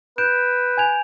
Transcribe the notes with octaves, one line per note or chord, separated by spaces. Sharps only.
B4 G6 D7 E7
G#5 G#6 F7